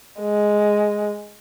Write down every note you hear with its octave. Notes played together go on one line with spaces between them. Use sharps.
G#3